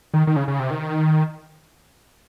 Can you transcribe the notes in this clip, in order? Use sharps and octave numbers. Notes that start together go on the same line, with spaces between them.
D#3
D#3
C#3
C#3
C3
D#3